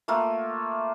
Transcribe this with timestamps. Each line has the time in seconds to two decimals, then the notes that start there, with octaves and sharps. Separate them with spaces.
0.08 A3 A#3 F4